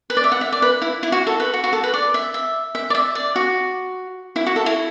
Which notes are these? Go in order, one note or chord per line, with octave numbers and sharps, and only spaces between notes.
B4
D5
E5
F#5
E5
D5
B4
E4
E4
F#4
A4
B4
F#4
F#4
A4
B4
D5
E5
E5
E5
D5
E5
D5
F#4
E4
F#4
A4
E4